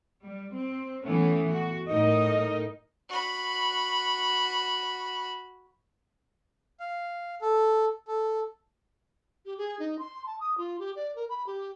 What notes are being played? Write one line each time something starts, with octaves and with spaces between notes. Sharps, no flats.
G3
C4
E3 A3 B3 C#4
F#4
A2 D#4 A#4 D#5
F#4 B5
F5
A4
A4
G4
G#4
D#4
C6
A5
D#6
F4
G4
D5
A#4
B5
G4